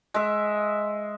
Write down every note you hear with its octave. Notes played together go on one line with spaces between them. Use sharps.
G#3 E5